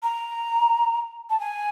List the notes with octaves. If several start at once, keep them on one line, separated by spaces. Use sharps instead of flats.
A#5
A5
G#5